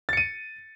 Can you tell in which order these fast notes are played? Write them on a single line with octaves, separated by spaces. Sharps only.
A6 C#7 D#7